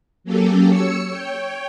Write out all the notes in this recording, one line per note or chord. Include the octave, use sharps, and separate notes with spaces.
F#3 A#3 C#4 G4 A4
C#5 E6 C#7
C#5 G5